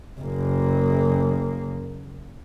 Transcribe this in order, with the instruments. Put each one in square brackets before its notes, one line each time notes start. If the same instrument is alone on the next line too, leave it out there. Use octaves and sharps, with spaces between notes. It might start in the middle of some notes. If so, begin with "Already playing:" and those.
[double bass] F#1 A#3